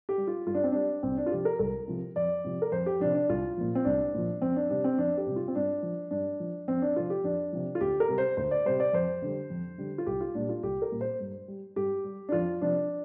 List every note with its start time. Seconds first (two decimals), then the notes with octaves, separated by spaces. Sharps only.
0.09 G4
0.18 G3
0.27 F4
0.46 G2 F4
0.55 D4
0.64 C4
0.72 G3 D4
1.03 C2 C4
1.17 D4
1.26 F4
1.31 C3 F3 G4
1.45 A#4
1.59 C2 A#4
1.88 C3 F3
2.16 F2 D5
2.44 C3 F3
2.62 A#4
2.72 F2 C5
2.86 G4
3.00 C3 F3 D4
3.14 D4
3.29 C2 F4
3.57 A#2 F3
3.75 C4
3.85 C2 D4
4.14 A#2 F3
4.41 F2 C4
4.56 D4
4.70 C3 G3 D4
4.84 C4
4.98 F2 D4
5.18 G4
5.27 C3 G3
5.36 F4
5.48 C4
5.55 G2 D4
5.83 F3
6.11 G2 D4
6.40 F3
6.68 F2 C4
6.82 D4
6.96 C3 F3 F4
7.10 G4
7.24 F2 D4
7.53 C3 F3
7.75 F4
7.81 D2 G4
8.00 A#4
8.08 C3 G3
8.18 C5
8.37 D2 C5
8.51 D5
8.65 C3 G3 C5
8.80 D5
8.93 F2 C5
9.22 D3 G3
9.50 F2
9.78 D3 G3
9.98 F4
10.06 C2 G4
10.21 F4
10.35 A#2 G3 D4
10.49 F4
10.63 C2 G4
10.82 A#4
10.92 A#2 G3
11.01 C5
11.20 G2
11.48 G3
11.76 G2 G4
12.04 G3
12.29 D4
12.32 F2 F4
12.61 C3 F3 D4